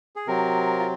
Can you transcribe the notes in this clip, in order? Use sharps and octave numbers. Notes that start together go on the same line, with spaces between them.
G#4
C3 F#3 C4 A#4
F4